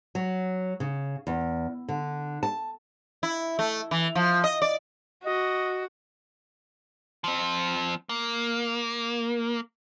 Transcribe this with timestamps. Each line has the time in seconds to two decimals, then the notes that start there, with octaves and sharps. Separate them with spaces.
0.15 F#3
0.80 C#3
1.27 E2
1.89 D3
2.43 A5
3.23 E4
3.59 A3
3.91 E3
4.15 F3
4.44 D#5
4.62 D5
5.24 F#4 D#5
7.24 F3 C4
8.09 A#3